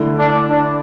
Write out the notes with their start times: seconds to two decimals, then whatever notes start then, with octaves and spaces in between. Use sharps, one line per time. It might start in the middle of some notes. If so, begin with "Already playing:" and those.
Already playing: D3 A3 E4
0.19 D4
0.51 D4